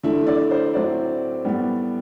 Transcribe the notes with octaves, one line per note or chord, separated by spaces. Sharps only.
D3 A3 E4
D5
C5
A2 F#3 C4 E4 D5
A2 G3 B3